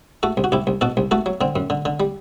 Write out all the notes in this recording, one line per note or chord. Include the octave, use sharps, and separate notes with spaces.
A3 F#4 A4
C2
F#4
C2 E4 G4
C2
B2 F#4 A4
C2
A3 F#4 A4
F#3
D3 C4
F#2
D3
D3
G3